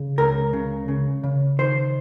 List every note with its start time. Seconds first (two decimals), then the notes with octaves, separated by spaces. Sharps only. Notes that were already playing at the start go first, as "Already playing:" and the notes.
Already playing: C#3
0.18 C#2 A#4
0.53 C#3
0.88 C#3
1.24 C#3
1.59 D#3 C5